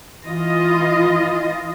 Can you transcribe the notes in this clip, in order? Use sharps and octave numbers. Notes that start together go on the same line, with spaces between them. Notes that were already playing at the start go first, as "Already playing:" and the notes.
E3 F4 D#5